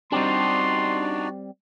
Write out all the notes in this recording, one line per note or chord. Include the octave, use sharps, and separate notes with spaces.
G3 C4 D4 D#4 F#4 G4 D5 C6